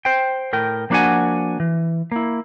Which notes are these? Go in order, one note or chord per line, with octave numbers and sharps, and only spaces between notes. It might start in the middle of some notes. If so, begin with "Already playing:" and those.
C5 G5
A2 A#4 G5
F3 A#3 D4 F#4 F#5 G#5
E3
A#3 E4